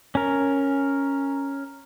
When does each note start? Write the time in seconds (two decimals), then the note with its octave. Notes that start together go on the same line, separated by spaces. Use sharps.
0.15 C#4 A#4